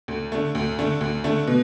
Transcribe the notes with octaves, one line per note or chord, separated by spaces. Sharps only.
D2
D3 A3
D2
D3 A3
D2
D3 A3
B2